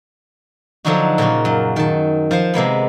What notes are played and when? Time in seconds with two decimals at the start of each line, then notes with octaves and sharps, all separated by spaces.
0.85 D3 F3 F#3 D4 D#4 F#4
1.18 A#2 C#3 F4 F#4
1.45 F#2
1.76 D#3 A5
2.31 F3 C5
2.54 C3 G#3 A#3 B3